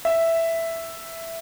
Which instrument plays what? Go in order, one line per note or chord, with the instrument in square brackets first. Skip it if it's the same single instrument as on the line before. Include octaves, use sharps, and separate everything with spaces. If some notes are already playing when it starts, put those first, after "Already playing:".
[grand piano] E5